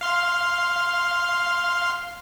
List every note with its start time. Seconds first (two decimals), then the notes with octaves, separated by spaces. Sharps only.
0.01 F5 C6 F6